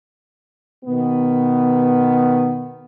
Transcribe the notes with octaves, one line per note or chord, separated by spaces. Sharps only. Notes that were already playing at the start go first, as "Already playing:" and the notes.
B2 D#3 B3